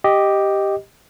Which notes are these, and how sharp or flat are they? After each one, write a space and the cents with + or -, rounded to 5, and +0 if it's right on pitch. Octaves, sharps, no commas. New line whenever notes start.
G4 +0 D#5 +0